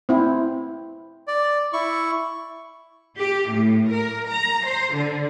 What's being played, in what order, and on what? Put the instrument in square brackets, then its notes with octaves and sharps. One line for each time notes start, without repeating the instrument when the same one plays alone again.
[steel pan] C4 E4
[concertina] D5
E4 C#6
[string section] G4
A2
A#4
A#5
C5
D3